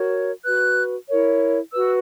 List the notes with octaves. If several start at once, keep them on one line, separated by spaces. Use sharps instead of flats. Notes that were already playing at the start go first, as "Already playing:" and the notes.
Already playing: F#4 A#4 C#5
F#4 B4 F#6
E4 A#4 C#5
F#4 B4 E6